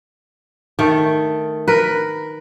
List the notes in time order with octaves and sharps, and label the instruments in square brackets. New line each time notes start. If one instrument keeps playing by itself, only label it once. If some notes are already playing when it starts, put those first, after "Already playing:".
[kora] D#3 A3
A#4 B4